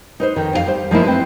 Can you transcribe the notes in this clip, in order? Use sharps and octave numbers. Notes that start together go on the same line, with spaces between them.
D#4 B4 C5
F2 D#3
F2 E4 F5
G3 C5
F3 G#3 A#3 E4
C4 B4